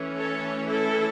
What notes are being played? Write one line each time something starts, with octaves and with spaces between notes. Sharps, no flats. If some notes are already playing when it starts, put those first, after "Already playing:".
Already playing: E3 A3 C#4
A4 C#5
E4 A4